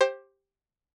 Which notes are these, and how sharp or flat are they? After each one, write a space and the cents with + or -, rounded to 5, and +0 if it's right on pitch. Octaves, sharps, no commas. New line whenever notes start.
G4 +0 C5 +20